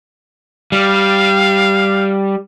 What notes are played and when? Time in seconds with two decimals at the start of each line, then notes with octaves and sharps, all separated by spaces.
0.72 G3 F5